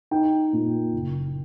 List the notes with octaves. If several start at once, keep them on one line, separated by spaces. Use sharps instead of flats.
D#4 G5
A#2
F#1